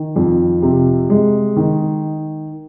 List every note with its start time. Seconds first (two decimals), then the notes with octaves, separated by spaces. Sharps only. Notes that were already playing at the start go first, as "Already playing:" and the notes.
Already playing: D#3
0.16 F2
0.62 C3
1.10 G#3
1.56 D#3